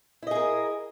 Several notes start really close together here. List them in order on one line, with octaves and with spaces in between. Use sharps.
E4 D#5 G#4 A#4